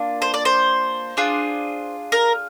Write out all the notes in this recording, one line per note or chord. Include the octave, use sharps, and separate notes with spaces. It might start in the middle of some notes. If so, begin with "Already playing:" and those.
Already playing: A#3 D4 F4
C5
D5
C5
D4 F4 G#4
A#4